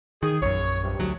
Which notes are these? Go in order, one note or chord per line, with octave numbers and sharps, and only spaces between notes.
D#3 G#4
A#1 F#2 C#5
G2 C3
D2 F#3